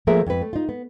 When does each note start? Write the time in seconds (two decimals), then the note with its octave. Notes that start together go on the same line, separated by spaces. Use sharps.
0.07 F3 A3 A#3 G#4 A#4 E5
0.27 F2 B4
0.41 A3
0.53 D#4 F4
0.69 B3